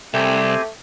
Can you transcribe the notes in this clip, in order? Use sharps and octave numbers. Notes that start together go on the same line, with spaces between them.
C2 A3 C4 G4 G#5